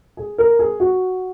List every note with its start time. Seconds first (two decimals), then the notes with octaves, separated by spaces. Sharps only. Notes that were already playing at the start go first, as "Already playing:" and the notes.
0.17 G#4
0.38 A#4
0.59 G#4
0.80 F#4